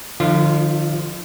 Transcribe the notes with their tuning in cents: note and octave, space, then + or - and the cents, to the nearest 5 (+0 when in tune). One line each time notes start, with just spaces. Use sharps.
D3 +40 F3 +15 F4 -30